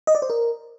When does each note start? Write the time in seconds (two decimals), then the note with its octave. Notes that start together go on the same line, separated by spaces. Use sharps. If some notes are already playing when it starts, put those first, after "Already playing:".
0.07 D#5
0.15 D5
0.22 C5
0.30 A#4